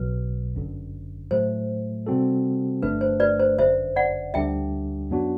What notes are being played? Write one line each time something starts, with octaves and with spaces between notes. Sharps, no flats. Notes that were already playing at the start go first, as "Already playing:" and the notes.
Already playing: B1 B2 F#3 B4
G1 F#2 D3
A2 F#3 A3 C5
C3 G3 C4 F#4 A4
G1 G2 D3 A3 D4 B4
C5
B4 D5
C5
G1 F#2 D3 C5 E5
D5 F#5
D2 D3 G3 D4 G4 E5 G5
F#2 F#3 B3 D4 F#4